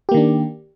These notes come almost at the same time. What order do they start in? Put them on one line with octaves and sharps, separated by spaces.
G4 A#3 D#3 D4